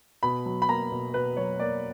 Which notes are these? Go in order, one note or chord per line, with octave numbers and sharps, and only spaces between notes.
B2 B5
F#3
B5
A#3 A#5
B2
B2 B4
F#3 C#5
A#3 D5